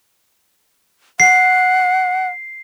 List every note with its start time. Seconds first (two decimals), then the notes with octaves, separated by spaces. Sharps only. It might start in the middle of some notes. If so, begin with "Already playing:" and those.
1.20 F#5 C7